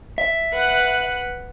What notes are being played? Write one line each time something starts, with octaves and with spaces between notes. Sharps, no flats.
E5
B4 F#5